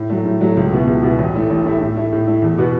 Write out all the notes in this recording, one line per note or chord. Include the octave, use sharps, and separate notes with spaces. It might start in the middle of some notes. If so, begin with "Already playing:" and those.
Already playing: A2
F#3 A3
A2
F#3 A3
C#2
B2 B3 E4
C#2
B2 B3 E4
A1
A2 A3 E4
A1
A2 A3 E4
A2
A3 E4
A2
A3 E4
E2
B2 B3 F#4